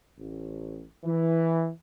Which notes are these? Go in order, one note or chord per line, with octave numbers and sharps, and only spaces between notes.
A1
E3